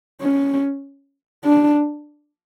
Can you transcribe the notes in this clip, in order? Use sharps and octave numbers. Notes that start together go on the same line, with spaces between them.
C#4
D4